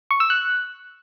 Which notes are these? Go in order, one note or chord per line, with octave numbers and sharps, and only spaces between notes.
C#6
E6
F#6